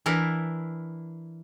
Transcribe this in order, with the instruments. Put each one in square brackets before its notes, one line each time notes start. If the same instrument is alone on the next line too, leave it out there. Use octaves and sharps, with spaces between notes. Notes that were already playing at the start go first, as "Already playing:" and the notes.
[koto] E3 D4 E4 A#4